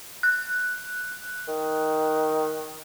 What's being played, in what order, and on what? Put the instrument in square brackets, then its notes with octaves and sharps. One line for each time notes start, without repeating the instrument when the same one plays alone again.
[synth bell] F#6
[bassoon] D#3